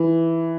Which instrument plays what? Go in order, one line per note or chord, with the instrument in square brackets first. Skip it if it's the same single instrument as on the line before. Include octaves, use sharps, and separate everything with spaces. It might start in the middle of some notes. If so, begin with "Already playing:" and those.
Already playing: [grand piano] E3